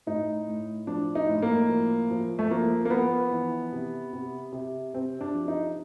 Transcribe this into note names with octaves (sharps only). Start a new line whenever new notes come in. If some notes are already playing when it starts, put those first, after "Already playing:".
A2 D#4
A2
F3 D4
D#4
A2
A#3
F3
F3
A3
F3 A#3
A#3
F3 B3
E3
C3
C3
C3
C3 C4
D4
F3
D#4